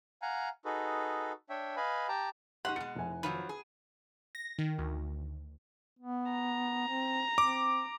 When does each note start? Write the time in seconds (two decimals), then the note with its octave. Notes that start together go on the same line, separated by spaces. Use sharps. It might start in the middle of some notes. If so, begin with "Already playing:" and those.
0.22 F5 F#5 G#5 A#5
0.65 D#4 F#4 G#4 A4 B4
1.50 D4 C#5 E5 G5
1.76 B4 D#5 F5 G#5 B5
2.08 G4 G5 A5 A#5
2.65 D#4 G4 F#5 C6 C#6 F#6
2.76 B2 G#3 C#7
2.95 F1 E4 G#5
3.23 D#3 F3 F#3 B4
3.49 G#4
4.35 A#6
4.59 D#3
4.78 D2
5.99 B3
6.32 A#5
6.87 C4
7.38 C4 D6